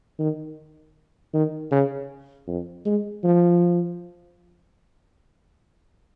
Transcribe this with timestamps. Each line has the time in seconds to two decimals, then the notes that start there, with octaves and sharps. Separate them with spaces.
0.19 D#3
1.34 D#3
1.71 C#3
2.47 F2
2.85 G#3
3.24 F3